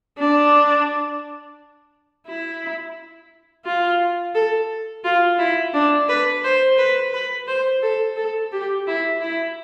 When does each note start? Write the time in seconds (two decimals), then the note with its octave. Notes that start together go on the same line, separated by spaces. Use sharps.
0.18 D4
2.26 E4
3.65 F4
4.35 A4
5.04 F4
5.39 E4
5.74 D4
6.09 B4
6.44 C5
6.78 B4
7.13 B4
7.47 C5
7.83 A4
8.17 A4
8.52 G4
8.87 E4
9.21 E4